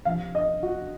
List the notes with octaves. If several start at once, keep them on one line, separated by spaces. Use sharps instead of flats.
C3 F3 F5
D#5
F#4